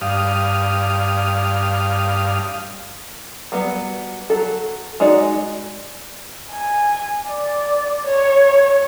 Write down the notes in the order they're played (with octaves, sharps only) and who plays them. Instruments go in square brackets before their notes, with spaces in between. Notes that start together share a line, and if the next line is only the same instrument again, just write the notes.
[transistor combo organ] G2 F5 D#6
[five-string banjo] F#3 G3 B3
F#3 A4
G#3 D#4 F#4 D5
[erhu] G#5
D5
C#5